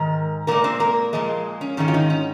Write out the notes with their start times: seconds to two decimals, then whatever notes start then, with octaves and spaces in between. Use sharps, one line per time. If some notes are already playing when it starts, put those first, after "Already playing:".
Already playing: G#2 D#3 A#4
0.47 A#2 G#3 A#3 A#4
0.64 C4 C5
0.80 A#3 A#4
1.13 A#2 F3 G#3
1.61 C#4
1.77 G#2 D#3 G#3 C#4
1.88 F4
1.94 D#3 D#4
2.10 C#4